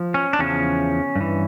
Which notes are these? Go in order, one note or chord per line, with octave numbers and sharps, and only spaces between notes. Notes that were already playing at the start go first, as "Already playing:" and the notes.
Already playing: F3
C#4
D4
E2 C#3 F3 C#4
G2
E3